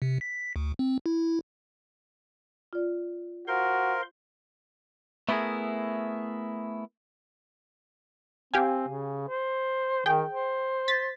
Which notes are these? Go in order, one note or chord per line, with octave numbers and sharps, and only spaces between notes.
C3
B6
D2
C4
E4
F4 D5
F#4 A#4 C5 F5 C6
A3 B3 E4 F#4 G#4 A#4
C4 G4 F5 G#5
C#3
C5
D#3 G#4 G5
C5
A6 B6